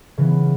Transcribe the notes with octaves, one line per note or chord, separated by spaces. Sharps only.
C#3 E3 B3